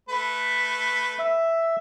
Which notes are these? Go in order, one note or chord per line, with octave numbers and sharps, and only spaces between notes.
A3 B4
E5